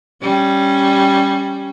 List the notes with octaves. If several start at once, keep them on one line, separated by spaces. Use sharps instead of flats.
G3 C#4